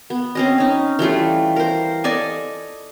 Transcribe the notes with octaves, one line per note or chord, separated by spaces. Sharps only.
B3
C4 C#4 D#5
C#4 D#4
E3 G3 A3 F4
A#4 C5
A4 D5 D#5 G#5